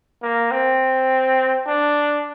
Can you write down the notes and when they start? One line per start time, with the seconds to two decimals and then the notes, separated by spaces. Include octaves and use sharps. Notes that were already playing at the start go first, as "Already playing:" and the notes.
0.22 A#3
0.51 C4
1.66 D4